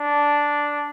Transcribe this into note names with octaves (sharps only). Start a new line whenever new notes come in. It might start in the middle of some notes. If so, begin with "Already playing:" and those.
Already playing: D4